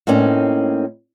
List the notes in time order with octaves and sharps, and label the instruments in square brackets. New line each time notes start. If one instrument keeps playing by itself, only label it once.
[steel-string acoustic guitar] A2 A#3 C4 C#4 D#4